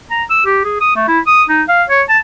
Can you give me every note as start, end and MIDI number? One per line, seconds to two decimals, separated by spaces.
0.10 0.23 82
0.30 0.45 88
0.45 0.61 67
0.64 0.78 68
0.80 0.95 87
0.96 1.06 57
1.08 1.19 64
1.27 1.43 87
1.49 1.62 63
1.68 1.83 77
1.89 2.02 73
2.09 2.18 81